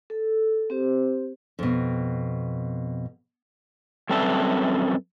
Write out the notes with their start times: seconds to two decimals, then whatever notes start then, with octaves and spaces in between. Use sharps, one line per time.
0.10 A4
0.70 C4 G4 C5
1.59 F2 B2
4.09 F#2 G3 C4 A4 B4 E5